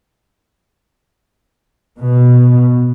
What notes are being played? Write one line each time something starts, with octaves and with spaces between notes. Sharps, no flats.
B2